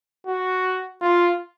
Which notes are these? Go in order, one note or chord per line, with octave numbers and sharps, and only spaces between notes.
F#4
F4